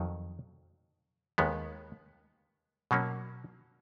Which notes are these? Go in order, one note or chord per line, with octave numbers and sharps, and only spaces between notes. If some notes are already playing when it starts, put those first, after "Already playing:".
Already playing: F2 D#3 F#3
D#2 D#3 G#3 B3
B2 F#3 A#3 C#4